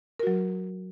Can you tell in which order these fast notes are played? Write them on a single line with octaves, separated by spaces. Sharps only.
A#4 F#4 F#3